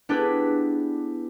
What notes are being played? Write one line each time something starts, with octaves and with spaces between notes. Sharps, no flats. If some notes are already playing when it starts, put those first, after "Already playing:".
B3 D4 E4 G4 G#4 B4